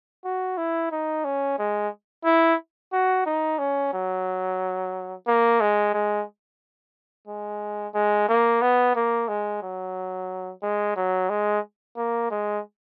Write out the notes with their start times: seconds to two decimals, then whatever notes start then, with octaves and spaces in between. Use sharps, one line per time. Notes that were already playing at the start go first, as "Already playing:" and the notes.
0.24 F#4
0.57 E4
0.92 D#4
1.24 C#4
1.58 G#3
2.25 E4
2.92 F#4
3.26 D#4
3.58 C#4
3.93 F#3
5.27 A#3
5.61 G#3
5.94 G#3
7.27 G#3
7.94 G#3
8.28 A#3
8.61 B3
8.96 A#3
9.28 G#3
9.62 F#3
10.62 G#3
10.96 F#3
11.29 G#3
11.97 A#3
12.30 G#3